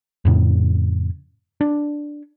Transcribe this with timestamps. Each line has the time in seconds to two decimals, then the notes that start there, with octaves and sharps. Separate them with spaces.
0.25 F2 A2 C#3
1.61 D4